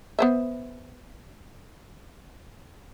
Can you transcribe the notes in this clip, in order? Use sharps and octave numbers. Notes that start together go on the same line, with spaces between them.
B3 C5 E5